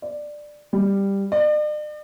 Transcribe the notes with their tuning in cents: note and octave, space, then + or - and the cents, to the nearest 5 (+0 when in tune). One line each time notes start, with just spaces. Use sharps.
D5 +10
G3 +10
D5 +45